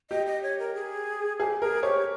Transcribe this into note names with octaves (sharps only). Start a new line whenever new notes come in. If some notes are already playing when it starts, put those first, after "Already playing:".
G4 D#5
D#5
C#5
A#4
G#4
G4 G#4
G#4 A#4
G4 C#5